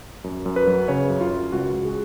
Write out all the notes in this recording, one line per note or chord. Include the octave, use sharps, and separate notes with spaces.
F#2
F#2
B4
F#3
C#3 C#5
F#2
F4
F#2
C#2 F#4
C#2
G#4